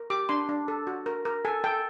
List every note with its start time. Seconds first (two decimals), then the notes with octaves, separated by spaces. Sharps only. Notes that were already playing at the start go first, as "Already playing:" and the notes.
Already playing: A#4
0.10 G4 D6
0.29 D4 C6
0.49 D4
0.68 A4
0.87 F#4
1.06 A#4
1.25 A#4
1.45 A4 G#5
1.64 A4 G5